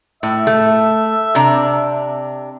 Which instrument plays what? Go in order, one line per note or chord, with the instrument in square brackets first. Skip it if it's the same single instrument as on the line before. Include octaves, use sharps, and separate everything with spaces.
[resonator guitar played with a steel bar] A2 [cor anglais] E5
[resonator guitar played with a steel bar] A3
C3 D4 A#5